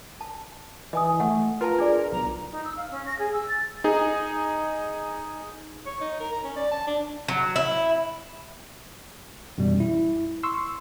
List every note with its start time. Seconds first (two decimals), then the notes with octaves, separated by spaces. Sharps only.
0.21 A5
0.93 E3 D#5 G#5 D#6
1.20 A3 F#5
1.61 F4 A#4 B4 A5
1.78 D4 G#4 D5
2.12 B1 A#5
2.51 D#4
2.65 E6
2.77 F5
2.91 C#4
3.06 A#6
3.19 G#4
3.33 E6
3.48 A6
3.84 D#4 G#4
5.86 C#5
6.01 D#4
6.20 A#4
6.32 A#5
6.44 C#4
6.56 D5
6.71 A5
6.87 D4
7.28 F#3
7.56 E4
9.58 F#2 B2 E3 G3
9.80 E4
10.43 C6 C#6 E6